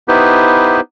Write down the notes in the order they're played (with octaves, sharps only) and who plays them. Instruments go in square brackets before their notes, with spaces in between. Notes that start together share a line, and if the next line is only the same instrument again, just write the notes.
[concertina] B3 D#4 E4 G4 B4 C5